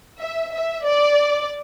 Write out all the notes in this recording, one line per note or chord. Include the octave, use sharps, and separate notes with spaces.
E5
E5
D5